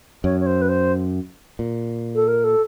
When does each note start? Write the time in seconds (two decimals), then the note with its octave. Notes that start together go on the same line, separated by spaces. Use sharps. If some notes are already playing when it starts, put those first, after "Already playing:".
0.24 F#2 C#5
0.40 C#5
0.46 C5
0.61 B4
0.68 C5
1.59 A#2
2.15 A4
2.27 A#4
2.43 A4